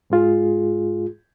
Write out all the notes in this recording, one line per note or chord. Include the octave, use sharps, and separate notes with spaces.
G#2 G#3 F4 G#4